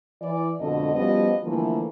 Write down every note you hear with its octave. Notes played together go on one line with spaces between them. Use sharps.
E3 D5
F2 B2 D3 G#3 A4 D#5
F3 G3 B3 C#4 F#4 D#5
D3 E3 F3 G3 A3 A#3